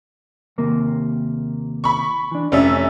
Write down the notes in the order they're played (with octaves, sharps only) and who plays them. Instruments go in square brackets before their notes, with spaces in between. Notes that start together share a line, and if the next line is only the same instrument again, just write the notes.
[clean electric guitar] D#2 C3 A#3
[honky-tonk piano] B5 C#6
[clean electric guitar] E3 D4
[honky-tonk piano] F1 C#4 E5 [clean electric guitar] D5